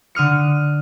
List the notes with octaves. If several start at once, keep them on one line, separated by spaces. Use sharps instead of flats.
D3 D#6 F6 C#7